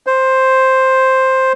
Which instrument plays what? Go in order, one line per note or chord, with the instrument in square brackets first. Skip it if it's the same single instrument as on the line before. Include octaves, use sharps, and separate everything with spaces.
[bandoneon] C5